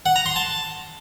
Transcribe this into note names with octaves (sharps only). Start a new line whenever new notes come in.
F#5
A#5
C6
A5